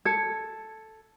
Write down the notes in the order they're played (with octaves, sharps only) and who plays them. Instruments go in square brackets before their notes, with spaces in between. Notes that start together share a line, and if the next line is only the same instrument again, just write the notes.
[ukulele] A4 [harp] G#6 C#7